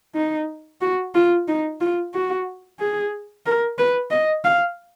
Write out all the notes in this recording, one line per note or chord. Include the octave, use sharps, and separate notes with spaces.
D#4
F#4
F4
D#4
F4
F#4
G#4
A#4
B4
D#5
F5